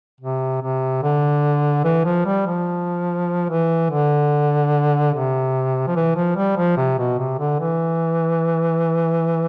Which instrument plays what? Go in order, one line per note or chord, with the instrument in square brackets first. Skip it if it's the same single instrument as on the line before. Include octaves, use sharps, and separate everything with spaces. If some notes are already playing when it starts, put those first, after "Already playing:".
[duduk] C3
C3
D3
E3
F3
G3
F3
E3
D3
C3
F3
E3
F3
G3
F3
C3
B2
C3
D3
E3